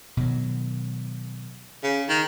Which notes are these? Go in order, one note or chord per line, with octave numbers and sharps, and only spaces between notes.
B2 D#3 F#3
C#3
D#3